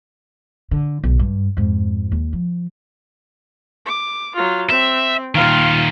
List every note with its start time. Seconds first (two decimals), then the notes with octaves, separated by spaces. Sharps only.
0.71 D3
1.03 B1 C3
1.19 G2
1.57 F2 G#2
2.12 D#2
2.33 F3
3.86 D6
4.35 F#3 F4
4.70 C4 E5
5.35 A#2 D#3 F4 F5